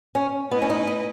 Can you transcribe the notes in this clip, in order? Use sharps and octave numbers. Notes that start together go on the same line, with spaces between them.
C#4
A3 B3 E4 B4 D#5
C#4
D#4
D#4